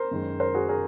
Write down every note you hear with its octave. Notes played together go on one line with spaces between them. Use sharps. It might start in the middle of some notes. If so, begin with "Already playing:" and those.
Already playing: A#4 C5
F#2 D#3 G#3
A#4 C5
F#4 G#4
G#4 A#4